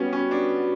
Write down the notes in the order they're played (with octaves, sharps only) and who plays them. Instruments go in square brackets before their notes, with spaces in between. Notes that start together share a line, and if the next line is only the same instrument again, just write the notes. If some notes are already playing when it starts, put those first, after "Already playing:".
Already playing: [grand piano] G3 B3 C#4 [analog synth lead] F#4
[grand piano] C#4
D4